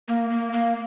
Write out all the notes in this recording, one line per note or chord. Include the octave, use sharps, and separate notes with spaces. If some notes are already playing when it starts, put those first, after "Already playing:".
A#3
A#3
A#3